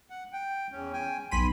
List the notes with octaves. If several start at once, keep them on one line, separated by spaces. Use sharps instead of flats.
F#5
G5
E2 C#4
G5 G#5
B1 B5 C6 B6 D#7